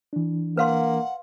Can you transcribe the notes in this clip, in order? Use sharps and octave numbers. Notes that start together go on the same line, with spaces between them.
E3 D4
A#3 B4 F5 F#5 C6